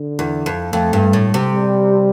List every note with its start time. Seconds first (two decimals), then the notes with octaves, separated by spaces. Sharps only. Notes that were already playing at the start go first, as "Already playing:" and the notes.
Already playing: D3
0.19 E2
0.46 F2
0.73 F2 A3
0.93 G2
1.13 A2
1.34 C3
1.54 G3